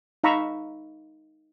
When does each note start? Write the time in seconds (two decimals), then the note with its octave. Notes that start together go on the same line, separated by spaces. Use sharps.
0.24 D#4 F5 A#5 B5 C#6 E6